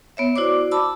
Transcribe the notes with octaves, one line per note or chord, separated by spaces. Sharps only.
B3 C#5 E5
E4 F#4 C5 D5 D6
A5 B5 D6 E6